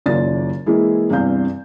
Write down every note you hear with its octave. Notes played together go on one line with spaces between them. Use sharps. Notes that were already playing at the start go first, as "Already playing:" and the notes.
F#1 D#2 C#3 F4 D5 A6
E3 G#3 A#3 E4 G#4
E2 G2 C3 F5 G6